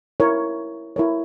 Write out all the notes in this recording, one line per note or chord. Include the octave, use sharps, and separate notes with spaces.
E4 A#4 C#5
E4 A#4 C#5